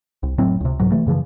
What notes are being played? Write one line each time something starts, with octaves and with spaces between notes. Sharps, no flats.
C2
F1 A2 F#3 C4
C#2 C3
C2 G#2 F#3
C3 E3 A3
F#2 C#3 E3 F3